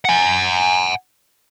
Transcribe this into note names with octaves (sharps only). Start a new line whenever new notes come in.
F#5 G#5